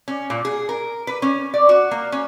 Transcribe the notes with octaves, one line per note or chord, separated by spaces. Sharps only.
C#4
A#2
G#4
A#4
B4
C#4
D5
F#4
A#3
C#4